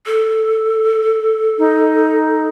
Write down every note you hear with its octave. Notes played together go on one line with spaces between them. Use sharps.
A4
D#4